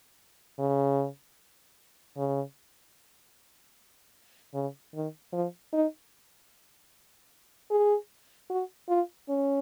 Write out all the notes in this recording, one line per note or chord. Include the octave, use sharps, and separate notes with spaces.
C#3
C#3
C#3
D#3
F3
D#4
G#4
F#4
F4
C#4